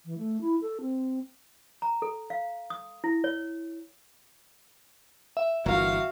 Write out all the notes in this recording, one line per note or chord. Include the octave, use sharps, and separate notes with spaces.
E3
A3
E4
A4
C4
A#5
A4
F5
D#6
E4
C#5
E5
G1 E3 A#3 F4 F#4 F5